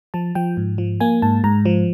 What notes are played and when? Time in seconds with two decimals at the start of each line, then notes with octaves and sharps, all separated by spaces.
0.14 F3 A5
0.35 F3 G5
0.57 G#2
0.78 F3
1.00 A#3 G#5
1.22 G#2 A5
1.44 G#2 A#5
1.66 F3